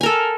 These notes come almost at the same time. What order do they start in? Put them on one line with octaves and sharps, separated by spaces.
G#5 A#4 A4